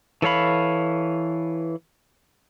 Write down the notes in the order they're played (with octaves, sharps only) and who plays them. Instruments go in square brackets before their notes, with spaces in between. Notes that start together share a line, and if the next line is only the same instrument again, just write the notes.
[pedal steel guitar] E3 A4 C#5 F5 B5